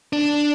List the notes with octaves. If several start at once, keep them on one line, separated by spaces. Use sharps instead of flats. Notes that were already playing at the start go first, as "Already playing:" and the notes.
D4